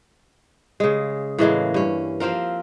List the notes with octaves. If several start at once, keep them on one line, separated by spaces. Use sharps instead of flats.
C#3 G#3
A2 E3 G#3 A#3
G2 C#4
F3 C4 F4 A#4